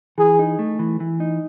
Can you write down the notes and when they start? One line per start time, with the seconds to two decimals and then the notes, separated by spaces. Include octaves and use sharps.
0.18 E3 G#4
0.39 D#4
0.59 A3
0.79 E3
1.00 E3
1.20 D#4